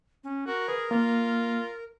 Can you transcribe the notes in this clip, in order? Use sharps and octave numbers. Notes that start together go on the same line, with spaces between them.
C#4
F#4 A#4
G#4 B4
A#3 F4